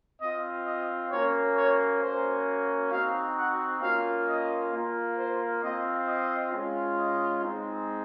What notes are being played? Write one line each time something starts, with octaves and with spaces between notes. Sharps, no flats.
C4 F4 D#5
D#5
A#3 C#4 F#4 C#5
C#5
A#3 C#4 F#4 C5
C4 D#4 F#4 F5
F#5
A#3 C#4 F4 F5
D#5
A#3 F4
C5
C4 F4 D#5
D#5
G#3 C#4 F4
D#5
G#3 C4 D#4